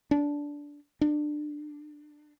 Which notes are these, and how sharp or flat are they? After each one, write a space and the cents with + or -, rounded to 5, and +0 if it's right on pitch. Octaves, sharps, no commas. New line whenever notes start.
D4 -15
D4 +20